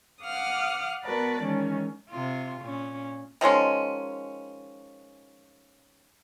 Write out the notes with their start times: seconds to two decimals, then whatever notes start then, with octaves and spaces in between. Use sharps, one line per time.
0.24 F5 F#5 D6 D#6 F6
1.04 B3 F#4 A#4 B4 D5 A5
1.42 D#3 E3 G#3 C#4
2.09 C3 F4
2.61 A#2 C#4
3.41 D#3 F3 G#3 C#4